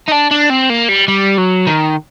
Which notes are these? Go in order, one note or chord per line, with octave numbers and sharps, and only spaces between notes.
D#4
D4
D4
C4
A#3
G3
G3
F#3
D#3